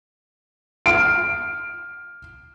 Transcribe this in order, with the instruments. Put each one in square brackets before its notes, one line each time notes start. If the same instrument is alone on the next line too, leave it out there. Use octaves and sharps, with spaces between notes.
[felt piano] F6 D7